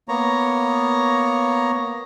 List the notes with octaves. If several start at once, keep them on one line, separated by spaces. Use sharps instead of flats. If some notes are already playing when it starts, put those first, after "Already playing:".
A#3 B3 C#5 A#5